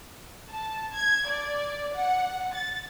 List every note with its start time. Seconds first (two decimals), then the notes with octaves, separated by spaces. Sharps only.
0.50 A5
0.95 G#6
1.29 D5
1.93 F#5
2.54 A6